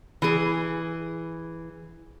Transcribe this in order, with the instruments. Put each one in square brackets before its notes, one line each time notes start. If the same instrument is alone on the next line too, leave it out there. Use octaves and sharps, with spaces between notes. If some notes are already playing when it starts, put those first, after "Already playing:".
[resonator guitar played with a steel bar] E3 G#4